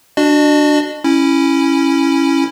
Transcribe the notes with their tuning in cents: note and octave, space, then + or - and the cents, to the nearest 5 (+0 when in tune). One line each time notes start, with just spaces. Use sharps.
D4 +0 F#4 +0 D#5 -45
C#4 -10 E4 +0